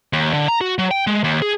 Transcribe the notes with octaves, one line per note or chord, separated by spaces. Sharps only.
D#2
D3
A#5
F#4
F#3
G5
G#3
D#2
G#4